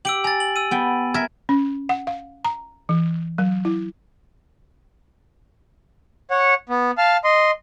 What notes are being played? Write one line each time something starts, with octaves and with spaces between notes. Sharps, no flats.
G4 E6 D7 F#7
G#5 A#5 A6
F#7
E6 D#7
B3 G5
A#4 E5 G#6
C#4
F#5
F5
A#5
E3
F#3
E4
C#5 F#5
B3
F5 A5 F6
D#5 C6